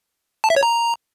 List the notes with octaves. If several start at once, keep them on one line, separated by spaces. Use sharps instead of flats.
A5
E5
C#5
A#5